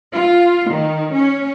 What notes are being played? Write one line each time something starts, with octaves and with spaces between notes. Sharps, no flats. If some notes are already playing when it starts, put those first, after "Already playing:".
F4
D#3
C#4